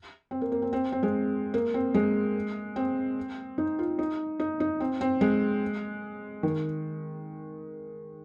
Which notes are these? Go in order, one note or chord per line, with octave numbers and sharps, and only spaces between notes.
C4
A#3
A#3
C4
C4
C4
G#3
A#3
C4
G#3
C4
D#4
F4
D#4
D#4
D#4
C4
C4
G#3
D#3